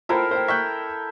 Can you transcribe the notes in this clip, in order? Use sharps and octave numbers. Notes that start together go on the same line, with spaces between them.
E4 F4 A4 A#4 C5 G5
C5 G5
E5 G5 C#6 F#6